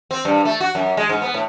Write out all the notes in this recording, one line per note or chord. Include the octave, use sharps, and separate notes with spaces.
C4
G2
A3
F#4
F#2
G#3
G#2
B3
A2